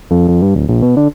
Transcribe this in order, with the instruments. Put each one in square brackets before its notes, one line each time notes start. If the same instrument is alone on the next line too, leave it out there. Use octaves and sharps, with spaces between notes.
[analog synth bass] F2
F2
G2
D1
A#1
B2
D3